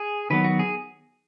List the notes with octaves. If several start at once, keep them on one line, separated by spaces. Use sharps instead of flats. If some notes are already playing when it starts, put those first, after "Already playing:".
Already playing: G#4
D#3 F#3 B3 B4
F#4
G#4